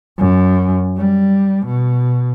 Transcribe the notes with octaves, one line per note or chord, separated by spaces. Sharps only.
F#2
G3
B2